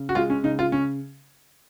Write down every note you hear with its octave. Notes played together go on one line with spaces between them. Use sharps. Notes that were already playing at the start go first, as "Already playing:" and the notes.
Already playing: C#3
F#4
G#3 F4
C#4
C#3 D#4
F4
C#3 C#4